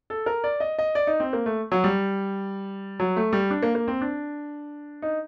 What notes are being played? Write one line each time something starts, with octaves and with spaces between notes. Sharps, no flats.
A4
A#4
D5
D#5
D#5
D5
D#4
C4
A#3
A3
F#3
G3
F#3
A3
G3
D4
A#3
A#3
C4
D4
D#4